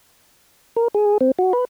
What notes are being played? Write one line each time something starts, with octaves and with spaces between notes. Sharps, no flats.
A#4
G#4
C4
F#4
B4